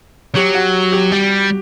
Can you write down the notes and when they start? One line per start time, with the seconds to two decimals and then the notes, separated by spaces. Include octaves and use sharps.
0.35 F#3 G4
0.55 F#4
0.92 G4
1.12 G3